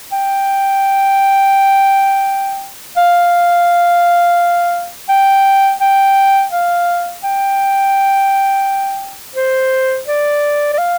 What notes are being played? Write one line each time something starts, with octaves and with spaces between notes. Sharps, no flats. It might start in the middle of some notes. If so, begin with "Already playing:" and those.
G5
F5
G5
G5
F5
G5
C5
D5
D5
F5